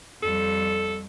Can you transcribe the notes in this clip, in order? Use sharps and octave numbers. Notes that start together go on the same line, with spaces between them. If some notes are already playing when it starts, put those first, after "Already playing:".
F2 G3 A4